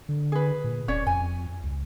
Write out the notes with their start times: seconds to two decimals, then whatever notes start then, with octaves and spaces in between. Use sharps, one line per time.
0.09 D3
0.32 G#4 B4
0.64 A#2
0.88 E1 C#4 C#5 D5
1.07 F2 G#5
1.63 C#2